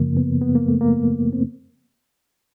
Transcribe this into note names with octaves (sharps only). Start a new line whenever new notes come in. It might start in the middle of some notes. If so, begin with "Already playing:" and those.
Already playing: F#2 C#3 F3 A#3
B3
B3
A#3
A3
A#3
C4